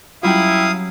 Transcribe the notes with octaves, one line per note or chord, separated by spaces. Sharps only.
F#3 G3 C#4 E4 F4 F5 G5 D#6